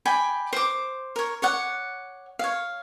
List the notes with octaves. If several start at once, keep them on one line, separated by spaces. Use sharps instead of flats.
D5 G5 G#5 B5
C5 D6
A#4 C#5
C#5 D5 F#5
C#5 F5